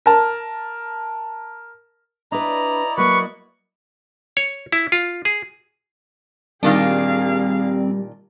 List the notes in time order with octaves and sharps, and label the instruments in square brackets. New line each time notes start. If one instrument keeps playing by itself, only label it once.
[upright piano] A#4 A5
[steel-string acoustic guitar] D4 B4 [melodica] E4 D5 D#5 [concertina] A#5
[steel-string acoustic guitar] F#3 A#3 [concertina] B4 [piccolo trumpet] C#6
[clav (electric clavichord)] C#5
E4
F4
G#4
[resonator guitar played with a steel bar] A#2 D#3 D4 [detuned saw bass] G3 [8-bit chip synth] C4 [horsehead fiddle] G#4 F5